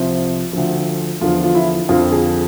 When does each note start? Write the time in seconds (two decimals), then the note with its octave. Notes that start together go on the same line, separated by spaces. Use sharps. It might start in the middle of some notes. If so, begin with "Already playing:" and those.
Already playing: C2 C3 F3 C5
0.53 D2 D3 F3
1.21 E2 D3 F3 F4
1.44 F4
1.55 E4
1.89 F2 D3 F3 F4
2.12 G#4